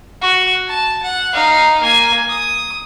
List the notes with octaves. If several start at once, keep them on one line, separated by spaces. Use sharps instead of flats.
F#4
A5
F#5
D#4 F5
A#3 G#5
D#6